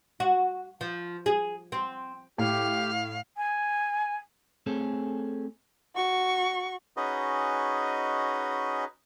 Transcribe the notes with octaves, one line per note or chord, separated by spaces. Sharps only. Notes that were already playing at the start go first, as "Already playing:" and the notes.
F#4
F3
G#4
C4
A2 G4 F5
G#5
A3 C4 C#4 G#4 A4
F#4 C#6
C#4 D#4 F#4 G#4 B4 D#5